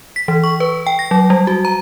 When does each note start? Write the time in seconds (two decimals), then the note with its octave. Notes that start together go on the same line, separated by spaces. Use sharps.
0.16 B6
0.28 E3
0.44 C#6
0.60 B4
0.87 G5
0.99 A#6
1.11 F#3
1.30 G3
1.47 F#4
1.65 A#5